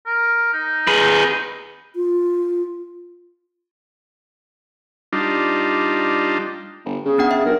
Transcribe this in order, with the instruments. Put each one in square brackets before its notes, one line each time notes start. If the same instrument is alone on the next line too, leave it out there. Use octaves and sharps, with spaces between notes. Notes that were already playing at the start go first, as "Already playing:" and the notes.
[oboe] A#4
D#4
[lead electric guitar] G#4 B4
[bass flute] F4
[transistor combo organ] G3 D4 D#4 F4
[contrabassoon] G1
[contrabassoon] C#3 [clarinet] G#4
[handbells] B3 D4 F#5
E5
[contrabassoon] B1 [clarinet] A#4